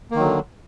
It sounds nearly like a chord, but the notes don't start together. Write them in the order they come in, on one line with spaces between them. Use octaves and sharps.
A#3 D#3 F#3 D3